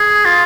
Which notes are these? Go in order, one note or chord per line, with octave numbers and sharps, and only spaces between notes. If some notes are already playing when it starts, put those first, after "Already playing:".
Already playing: G#4
F4